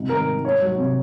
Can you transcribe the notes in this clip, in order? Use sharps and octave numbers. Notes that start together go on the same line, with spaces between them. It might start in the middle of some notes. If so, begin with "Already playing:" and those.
Already playing: G#2 C3
D#3 A#4
G#2
D#4 C#5
F#3
C3